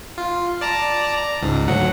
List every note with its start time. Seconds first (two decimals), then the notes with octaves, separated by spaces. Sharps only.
0.18 F4
0.61 D5 A5 A#5
1.16 A#5
1.42 C#2 G#2
1.68 D2 F#3 F#5